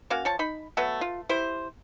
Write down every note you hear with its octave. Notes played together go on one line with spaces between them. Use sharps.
A#3 C#4 F#4 F5
F3 C#5 A5
D#4 B5
F#3 A3 B3
F4
E4 G4 C5